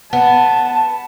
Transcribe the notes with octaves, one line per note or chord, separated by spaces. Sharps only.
B3 A5